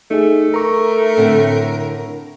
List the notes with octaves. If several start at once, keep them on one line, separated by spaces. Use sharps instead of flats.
A3 D#4 G#4
A#4 A#5 C#6
A2 D3 C4